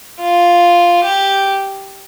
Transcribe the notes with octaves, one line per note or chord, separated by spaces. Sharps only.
F4
G4